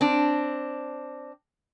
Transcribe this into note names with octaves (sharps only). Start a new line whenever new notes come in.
C4 D4